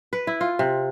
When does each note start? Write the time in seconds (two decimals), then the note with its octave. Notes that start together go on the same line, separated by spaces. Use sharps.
0.13 B4
0.27 E4
0.41 F4
0.59 C3